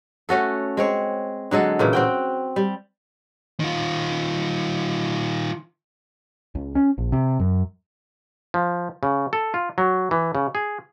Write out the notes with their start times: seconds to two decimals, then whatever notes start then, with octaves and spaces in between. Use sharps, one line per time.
0.29 A3 C#4 F#4 A4
0.77 G#3 C4 C#5
1.51 D3 F#3 G#3 A4
1.79 A#2 C#3 E3
1.93 C4 F#4 G5
2.56 G3
3.60 D#3 F4
6.55 C#2
6.75 C#4
6.98 A#1
7.12 C3
7.40 F#2
8.54 F3
9.03 C#3
9.33 A4
9.54 F4
9.78 F#3
10.11 E3
10.35 C#3
10.55 G#4